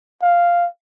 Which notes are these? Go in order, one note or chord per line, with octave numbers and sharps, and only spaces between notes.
F5